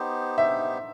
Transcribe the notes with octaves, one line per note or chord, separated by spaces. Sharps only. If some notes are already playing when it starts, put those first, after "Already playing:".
Already playing: B3 D#4 G4 C5
E5